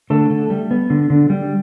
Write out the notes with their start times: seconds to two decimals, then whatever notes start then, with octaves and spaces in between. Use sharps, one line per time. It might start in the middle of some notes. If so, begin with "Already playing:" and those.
0.10 D3 A3 A4
0.30 D3
0.50 G3
0.71 B3
0.90 D3
1.10 D3
1.30 G3